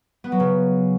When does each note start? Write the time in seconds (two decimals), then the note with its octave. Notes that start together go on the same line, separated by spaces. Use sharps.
0.24 B3
0.32 F#3
0.40 C#3